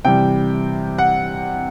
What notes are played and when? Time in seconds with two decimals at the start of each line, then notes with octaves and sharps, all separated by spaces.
0.05 C3 E3 G3 G5
0.98 F#5